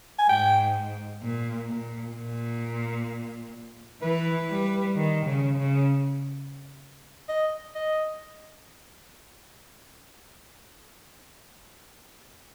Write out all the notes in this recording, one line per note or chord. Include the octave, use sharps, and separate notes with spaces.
G#5
G#2 G5
A#2
A#2
A#2
E3 B4
G3
D#3
C#3
C#3
D#5
D#5